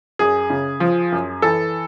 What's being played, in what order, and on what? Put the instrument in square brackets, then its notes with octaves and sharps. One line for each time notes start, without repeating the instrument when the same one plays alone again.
[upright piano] F#2 G#4
C#3
F3
F#2
E3 A4